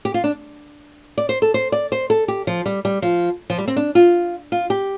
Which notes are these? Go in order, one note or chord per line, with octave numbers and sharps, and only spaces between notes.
G4
F4
D4
D5
C5
A4
C5
D5
C5
A4
G4
F3
G3
G3
F3
F3
G3
C4
D4
F4
F4
G4